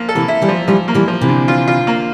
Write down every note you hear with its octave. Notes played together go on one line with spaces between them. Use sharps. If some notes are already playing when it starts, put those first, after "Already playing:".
Already playing: F3 A#3
A4
C3 E3
E4
E3 G3
F3
E3 F3 G3
A#3
E3 G3
F3
C3 E3
D3
F4
F4
A#3